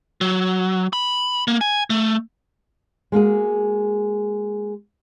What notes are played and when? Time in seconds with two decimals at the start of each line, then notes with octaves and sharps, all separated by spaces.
0.21 F#3
0.93 B5
1.48 A#3
1.61 G#5
1.90 A3
3.12 G#3 A#3 F#4 G#4